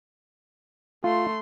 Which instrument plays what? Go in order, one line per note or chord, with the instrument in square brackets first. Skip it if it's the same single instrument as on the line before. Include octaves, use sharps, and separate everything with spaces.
[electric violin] A3 C6 [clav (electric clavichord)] F4